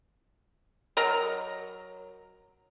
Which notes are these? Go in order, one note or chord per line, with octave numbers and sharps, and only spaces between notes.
F#3 A#4 D#5 A#5